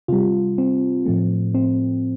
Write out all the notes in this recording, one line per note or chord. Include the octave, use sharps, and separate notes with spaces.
C3 G3 F4
C4
A2 F3 A3
C4